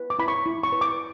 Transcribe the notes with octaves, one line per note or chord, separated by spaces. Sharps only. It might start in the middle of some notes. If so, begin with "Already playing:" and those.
Already playing: B4
D6
E4 B5
C#6
E4
C#6
B4
D6